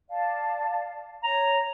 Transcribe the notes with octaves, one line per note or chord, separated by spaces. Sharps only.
D5 F5 A5
C#5 A#5